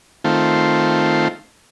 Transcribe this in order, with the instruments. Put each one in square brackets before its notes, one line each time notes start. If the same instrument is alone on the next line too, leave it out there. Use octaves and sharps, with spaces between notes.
[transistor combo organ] D#3 A3 C4 F4